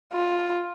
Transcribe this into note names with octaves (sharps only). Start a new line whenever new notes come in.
F4